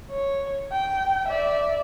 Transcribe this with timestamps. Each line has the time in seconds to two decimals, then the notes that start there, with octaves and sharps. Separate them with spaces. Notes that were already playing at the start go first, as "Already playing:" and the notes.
0.11 C#5
0.72 G5
1.28 D5 E5